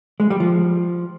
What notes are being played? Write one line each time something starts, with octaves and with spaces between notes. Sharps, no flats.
G#3
G3
F3